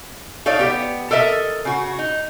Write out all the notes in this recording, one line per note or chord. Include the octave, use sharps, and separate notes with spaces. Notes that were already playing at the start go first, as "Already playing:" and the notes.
D#4 A4 C#5 D5 F5
B3 G4
A4 A#4 D#5 E5
C#3 F#4
D#4